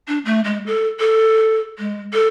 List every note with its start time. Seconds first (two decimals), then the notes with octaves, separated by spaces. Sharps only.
0.08 D4
0.25 A3
0.44 G#3
0.67 A4
1.00 A4
1.79 G#3
2.14 A4